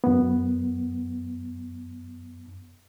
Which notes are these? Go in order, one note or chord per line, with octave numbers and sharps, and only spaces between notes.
F#2 B3